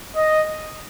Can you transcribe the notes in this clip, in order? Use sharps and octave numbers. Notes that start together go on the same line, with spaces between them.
D#5